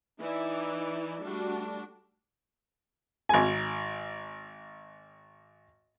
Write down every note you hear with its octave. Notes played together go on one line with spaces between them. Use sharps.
E3 D#4 E4 D5 E5
G3 A3 D4 F#4
G#1 G#5